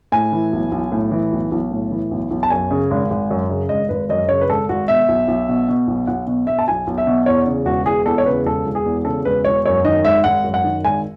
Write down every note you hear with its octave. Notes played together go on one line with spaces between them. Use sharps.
A2 G#5
E3
B1
B1
A2
E3
B1
B1
A2
E3
B1
B1
A5
F#2 G#5
C#3
G#1
G#1
F#2
C#3
G#1 D#5
G#1 B4
F#2 D#5
C#3 C#5
B4
G#1 A4
G#1 F#4
B2 E5
B1
B1
B2
B2
B1
B1 F#5
B2
B2 E5
A5
B1 G#5
B1
E5
B2
E2 C#5
C#3
E1 F#4
E1 G#4
E2 A4
C#5
C#3 B4
E1 A4
E1
G#4
E2
C#3 A4
E1 B4
E1 C#5
F#2 C#5
D#3 D#5
G#1 E5
G#1 F#5
F#2
F#5
D#3
G#1 G#5